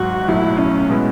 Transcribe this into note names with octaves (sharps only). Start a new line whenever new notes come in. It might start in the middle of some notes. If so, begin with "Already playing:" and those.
Already playing: G#1 G#2 F#3 F#4
B1 A2 F#3 A3 E4
C#4
B2 G#3 B3 E4